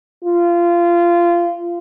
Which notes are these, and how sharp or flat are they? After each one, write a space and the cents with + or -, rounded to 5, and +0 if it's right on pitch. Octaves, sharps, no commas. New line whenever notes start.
F4 -20